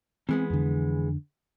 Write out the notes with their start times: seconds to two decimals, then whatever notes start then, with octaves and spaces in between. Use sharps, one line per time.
0.29 E3 G#3 B3 C4
0.50 F2 D3